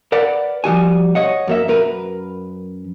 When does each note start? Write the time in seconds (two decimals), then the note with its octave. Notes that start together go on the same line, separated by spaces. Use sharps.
0.12 A#4 B4 D5 F#5
0.64 F3 G3 F#4 G#5
1.15 C#5 D#5 F#5
1.47 F#2 A#3 E5
1.68 F#2 A#4 B4